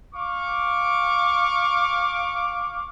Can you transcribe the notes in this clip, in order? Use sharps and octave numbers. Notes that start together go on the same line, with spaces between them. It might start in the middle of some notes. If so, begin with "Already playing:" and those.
F5 C#6 D6